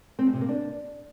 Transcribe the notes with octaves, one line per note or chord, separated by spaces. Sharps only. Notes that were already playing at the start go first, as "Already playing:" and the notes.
C4
A2
C3
A#3
D4